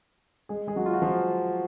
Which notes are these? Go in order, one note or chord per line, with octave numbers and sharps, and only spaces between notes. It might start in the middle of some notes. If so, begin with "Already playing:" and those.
G#3 G#4
G#3 G#4
F#3 F#4
F4
F#4
F3 F4